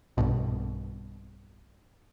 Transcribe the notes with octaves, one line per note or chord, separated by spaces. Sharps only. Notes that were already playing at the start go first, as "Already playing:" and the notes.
B1 G2 B2